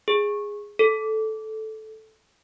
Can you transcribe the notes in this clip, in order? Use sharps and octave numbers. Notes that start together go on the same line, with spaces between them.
G#4
A4